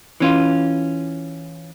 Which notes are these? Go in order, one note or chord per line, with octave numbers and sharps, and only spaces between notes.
E3 C#4 F4